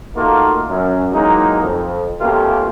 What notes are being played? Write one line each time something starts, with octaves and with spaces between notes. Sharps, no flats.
A3 A#3 D#4 F4 F#4 A#4
F#2
E3 F#3 G#3 A#3 D#4
F2
B2 A3 A#3 C#4 F4 G4